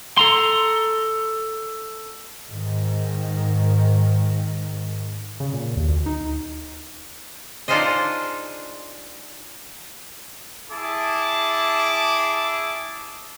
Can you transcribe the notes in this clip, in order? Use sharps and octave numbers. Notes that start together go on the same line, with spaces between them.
A4 A#5 C6
G#2 D#3
C#3
A#2
D#2
D2
D#4
D4 D#4 F4 G#4 C5 D#5
E4 G#4 A5 D6